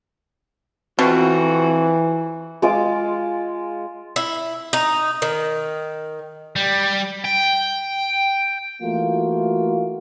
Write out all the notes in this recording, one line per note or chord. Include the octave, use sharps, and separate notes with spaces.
F2 B2 E3 C4 F4 F#4
G#3 F4 D6
E4
D#4
D#3
G3
G5
E3 A3 A#3 F4 F#4